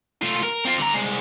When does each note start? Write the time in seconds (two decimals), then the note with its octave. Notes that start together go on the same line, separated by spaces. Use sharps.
0.22 A3 F4
0.43 A#4
0.65 C4 F4
0.78 D3 A#5
0.94 C2 G#3